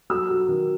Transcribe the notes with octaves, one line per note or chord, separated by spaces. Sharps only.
F#3 E6
F#3
D#3